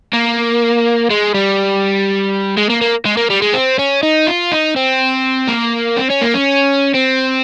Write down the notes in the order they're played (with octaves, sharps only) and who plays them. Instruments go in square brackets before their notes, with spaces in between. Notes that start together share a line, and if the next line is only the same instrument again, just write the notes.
[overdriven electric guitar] A#3
G#3
G3
G#3
A#3
A#3
G#3
A#3
G3
G#3
C4
C#4
D#4
F4
D#4
C4
A#3
C4
C#4
A#3
C#4
C4